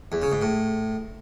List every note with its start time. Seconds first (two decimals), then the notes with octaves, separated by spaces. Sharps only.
0.12 E2
0.22 C#3
0.32 G#2
0.42 A2